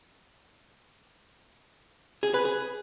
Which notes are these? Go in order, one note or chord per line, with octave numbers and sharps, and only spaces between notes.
G#4
B4
G#4